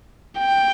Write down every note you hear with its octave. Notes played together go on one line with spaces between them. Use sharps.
G5